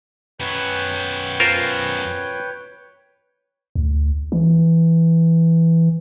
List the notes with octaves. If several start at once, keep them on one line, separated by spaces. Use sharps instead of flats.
F#2 B3 B4 C#5 G5
F4 A#4 C5
D2
E3